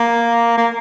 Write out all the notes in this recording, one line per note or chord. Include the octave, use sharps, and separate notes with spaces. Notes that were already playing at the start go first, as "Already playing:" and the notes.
Already playing: A#3
A#3